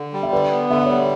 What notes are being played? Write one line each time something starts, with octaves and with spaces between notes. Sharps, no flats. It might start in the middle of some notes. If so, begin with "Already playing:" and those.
Already playing: D3
G3
E5
D3 B4 D5
B3
D3 E5
F#5
G3 C#5 E5